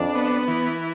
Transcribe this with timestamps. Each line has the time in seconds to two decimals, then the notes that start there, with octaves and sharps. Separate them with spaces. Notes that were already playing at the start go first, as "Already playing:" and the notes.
Already playing: F2 D4
0.15 B3
0.48 E3